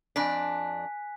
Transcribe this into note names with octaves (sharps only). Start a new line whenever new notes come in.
F2 D4 G#5 F#6 B6